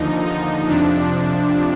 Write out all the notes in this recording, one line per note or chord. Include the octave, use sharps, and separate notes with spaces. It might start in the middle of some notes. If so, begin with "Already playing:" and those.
Already playing: D#2 D3 F3 D#4
D#4
F2 C3 F3 D4